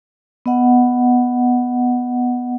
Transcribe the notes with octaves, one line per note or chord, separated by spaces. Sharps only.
B3 D#5 F#5